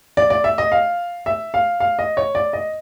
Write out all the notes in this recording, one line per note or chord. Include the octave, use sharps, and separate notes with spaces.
D5
D5
E5
D#5
F5
E5
F5
F5
D#5
C#5
D5
D#5